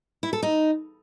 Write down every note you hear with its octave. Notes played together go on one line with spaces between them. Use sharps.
E4
A4
D#4